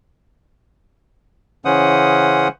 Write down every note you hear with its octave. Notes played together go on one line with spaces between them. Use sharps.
C#3 E3 C#4 C5 F#5 D#6